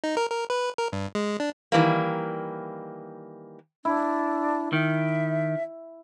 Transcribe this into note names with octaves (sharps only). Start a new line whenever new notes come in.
D#4
A#4
A#4
B4
A#4
G2
G#3
D4
D#3 E3 G3 A#3
D4 E4
D#3 E5